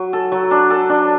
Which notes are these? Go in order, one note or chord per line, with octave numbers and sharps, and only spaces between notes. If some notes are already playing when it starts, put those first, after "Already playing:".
Already playing: F#3
A4
F#3
D4
A4
D4